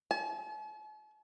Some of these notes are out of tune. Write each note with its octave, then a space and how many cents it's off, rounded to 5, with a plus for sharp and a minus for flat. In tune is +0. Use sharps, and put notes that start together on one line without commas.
A5 -45